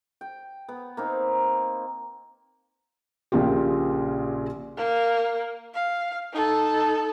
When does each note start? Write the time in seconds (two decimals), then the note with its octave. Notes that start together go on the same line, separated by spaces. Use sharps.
0.21 G5
0.69 B3
0.97 A#3 C4 D#4
3.32 A#1 A#2 C#3 F4 G4
4.77 A#3
5.74 F5
6.33 D#4 A4